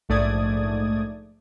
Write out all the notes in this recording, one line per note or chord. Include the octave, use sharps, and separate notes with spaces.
A#1 G#2 A3 D5 D#6 G#6